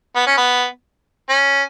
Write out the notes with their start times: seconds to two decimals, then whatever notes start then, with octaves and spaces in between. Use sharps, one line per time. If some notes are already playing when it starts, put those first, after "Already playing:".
0.16 B3
0.27 C#4
0.37 B3
1.29 C#4